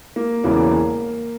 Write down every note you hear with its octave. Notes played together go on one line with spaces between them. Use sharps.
A#3
E1 E2 C#3 E3 A#3